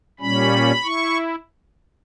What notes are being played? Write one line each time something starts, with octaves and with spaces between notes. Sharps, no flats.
A#2 G3 C#4 B5
E4 C#6